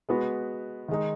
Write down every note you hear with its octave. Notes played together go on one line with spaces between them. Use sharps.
G#3 B3 F#4 B4
D#3 G#3 D#4